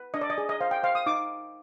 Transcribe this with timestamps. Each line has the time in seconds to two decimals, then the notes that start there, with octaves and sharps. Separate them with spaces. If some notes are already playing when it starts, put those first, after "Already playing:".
Already playing: B4
0.14 D4 D#5
0.21 D5
0.30 D#5
0.38 G#4
0.49 D#5
0.61 C5 F5
0.71 G5
0.83 C5 F5
0.95 D#6
1.06 D#4 D6